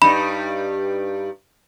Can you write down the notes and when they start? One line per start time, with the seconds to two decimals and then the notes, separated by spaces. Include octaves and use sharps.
0.02 G2 G3 D#4 B5